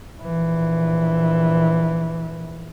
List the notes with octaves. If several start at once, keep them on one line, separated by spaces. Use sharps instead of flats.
A#1 E3